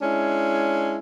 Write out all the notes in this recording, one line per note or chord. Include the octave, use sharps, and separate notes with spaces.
G#3 C#4 D4 E4